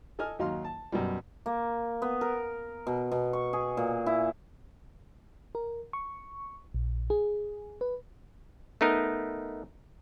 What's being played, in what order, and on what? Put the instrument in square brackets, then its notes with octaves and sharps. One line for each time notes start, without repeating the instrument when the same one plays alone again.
[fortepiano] A4 D#5 G#5 F6
D#2 F#3 D#4 F#4 F5 C6
A5
F#2 B2 G3
[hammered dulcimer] A#3
B3
A#4
B2
B2
C#6
G#4
A#2
E4
[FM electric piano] A#4
C#6
A#1
G#4
B4
[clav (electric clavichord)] A3 B3 D#4 A#4 D#5